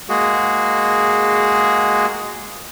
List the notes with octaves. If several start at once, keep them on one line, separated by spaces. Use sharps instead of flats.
G#3 A#3 F#4 G#4